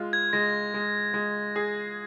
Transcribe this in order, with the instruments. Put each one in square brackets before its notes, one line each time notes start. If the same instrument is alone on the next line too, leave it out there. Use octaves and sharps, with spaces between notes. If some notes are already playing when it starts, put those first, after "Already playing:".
Already playing: [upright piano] G#3 F4
[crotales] G#6
[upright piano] G#3 [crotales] A#6
[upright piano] G#3
G#3
G#4